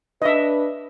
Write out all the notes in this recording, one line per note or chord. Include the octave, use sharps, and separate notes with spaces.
D4 B4 D#5 E5